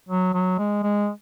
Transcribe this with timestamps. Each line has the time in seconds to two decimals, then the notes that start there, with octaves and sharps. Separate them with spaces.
0.09 F#3
0.34 F#3
0.58 G#3
0.83 G#3